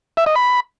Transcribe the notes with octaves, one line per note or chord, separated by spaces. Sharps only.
E5
D#5
B5